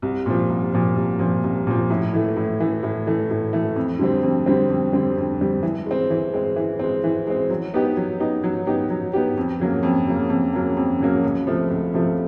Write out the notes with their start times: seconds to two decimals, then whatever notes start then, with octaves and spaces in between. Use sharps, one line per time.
0.02 C2
0.26 A#2 F3
0.49 C2
0.74 A#2 F3
0.96 C2
1.19 A#2 F3
1.44 C2
1.67 A#2 F3
1.90 A2
2.13 E3 A3
2.36 A2
2.60 E3 A3
2.83 A2
3.07 E3 A3
3.30 A2
3.53 E3 A3
3.76 F2
3.99 D3 G3 C4
4.23 F2
4.46 D3 G3 C4
4.70 F2
4.93 D3 G3 C4
5.17 F2
5.40 D3 G3 C4
5.63 E3
5.86 G#3 C4
6.10 E3
6.34 G#3 C4
6.56 E3
6.79 G#3 C4
7.04 E3
7.27 G#3 C4
7.50 F#3
7.74 B3 D#4 G4
7.97 F#3
8.20 B3 D#4 G4
8.44 F#3
8.67 B3 D#4 G4
8.90 F#3
9.13 B3 D#4 G4
9.37 F2
9.60 C#3 F#3 A#3
9.83 F2
10.07 C#3 F#3 A#3
10.30 F2
10.53 C#3 F#3 A#3
10.77 F2
11.00 C#3 F#3 A#3
11.24 C#2
11.46 C3 F3 A3
11.71 C#2
11.94 C3 F3 A3